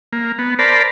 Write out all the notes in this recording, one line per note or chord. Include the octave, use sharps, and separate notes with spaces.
A#3
B3
A#4 C5 D5 A5 B5